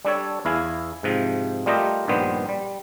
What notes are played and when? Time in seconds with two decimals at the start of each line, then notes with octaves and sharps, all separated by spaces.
0.05 G3 D4 A4 C#5
0.45 E2 E4 F5 G#5
1.03 G#2 C3 F3
1.66 G3 A3 F4 G4 A#4 D#5
2.08 A#1 G2 D#3 G3 B3 C5
2.49 G3